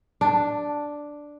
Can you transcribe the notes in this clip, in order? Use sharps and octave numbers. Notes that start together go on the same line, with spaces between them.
D4